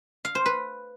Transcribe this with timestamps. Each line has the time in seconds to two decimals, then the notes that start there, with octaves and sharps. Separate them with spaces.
0.25 F5
0.35 C5
0.46 B4